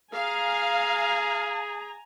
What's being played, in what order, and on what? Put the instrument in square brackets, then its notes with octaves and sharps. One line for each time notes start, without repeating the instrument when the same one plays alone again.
[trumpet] G#4 [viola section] F5 [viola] G#5 A#5